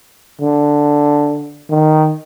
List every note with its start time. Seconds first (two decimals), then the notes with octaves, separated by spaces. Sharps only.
0.41 D3
1.70 D#3